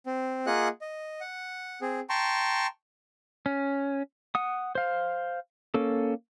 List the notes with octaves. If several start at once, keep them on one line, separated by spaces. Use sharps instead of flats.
C4
A#3 F4 G#4 D#5 F#5 F#6
D#5
F#5
C4 G#4
G5 A5 A#5 C6 C#6
C#4
F#5 D#6
C5 F5
A#3 C#4 A4